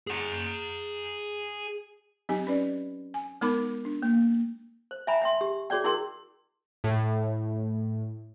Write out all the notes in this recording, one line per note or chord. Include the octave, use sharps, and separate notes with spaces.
G#4 F#5
F#3 C4 D#4 G4 G#5
C#4 B4 D5
G#5
G#3 B3 D#4 A#4 B5 D6
D4
A#3
C5
E5 G5 G#5 A#5 B5
E5 G5 C6
G4
F#4 G#4 C#5 D5 G5
E4 F#4 G#4 A#4 G5 C6
A2